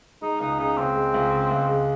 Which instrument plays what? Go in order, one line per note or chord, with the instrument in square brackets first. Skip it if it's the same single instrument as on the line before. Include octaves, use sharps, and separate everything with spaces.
[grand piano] G#3 [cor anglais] D#4
[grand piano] C#2 [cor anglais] D#4
[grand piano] C#3 [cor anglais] D#4
[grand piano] C#2 [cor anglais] C4
[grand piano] G#3
C#2
C#3
C#2
G#3